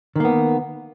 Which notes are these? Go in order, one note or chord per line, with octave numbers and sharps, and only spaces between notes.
D#3 A#3 B3